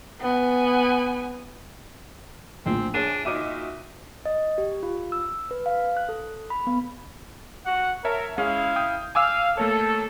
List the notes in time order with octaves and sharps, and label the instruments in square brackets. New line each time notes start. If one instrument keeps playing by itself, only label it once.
[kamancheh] B3 G#5
[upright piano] A#1 A2 [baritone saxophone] C4
[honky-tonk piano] A#1 G#5 D#7 [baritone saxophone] D4 [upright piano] G#4 C#5
[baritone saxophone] A#2 [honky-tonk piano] D#4 F#4 E5 [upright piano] D6 D#7
[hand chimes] D#5
G4
F4
E6
B4
F5
F#6
A4
B5
B3
[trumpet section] F#4 F#5
[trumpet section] A#4 [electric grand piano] C#5 E5 A5
[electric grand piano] G#3 C#4 G#4 [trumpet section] E4 F5
[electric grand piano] G5 D#6 G6
[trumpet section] F5 [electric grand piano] G#5 D6 E6
[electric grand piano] A3 A#3 C#5 [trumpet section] A4